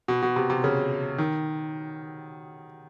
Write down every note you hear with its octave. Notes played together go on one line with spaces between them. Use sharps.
B2
B2
C3
C3
C#3
D#3